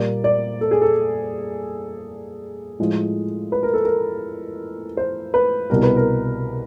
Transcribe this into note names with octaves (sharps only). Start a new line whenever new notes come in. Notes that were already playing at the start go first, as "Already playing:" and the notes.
Already playing: A#2 G3 A#3 D5
D5
A4
G#4
A4
A2 F3 G#3
B4
A#4
A4
A#4
C5
B4
C2 B2 G3 A#4
B4
A#4